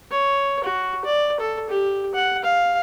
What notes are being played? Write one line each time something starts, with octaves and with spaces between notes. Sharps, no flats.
C#5
F#4
D5
A4
G4
F#5
F5